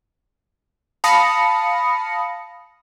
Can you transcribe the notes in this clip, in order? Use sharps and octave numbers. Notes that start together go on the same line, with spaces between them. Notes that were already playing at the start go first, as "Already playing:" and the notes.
F5 A5 B5 D#6 A#6 C#7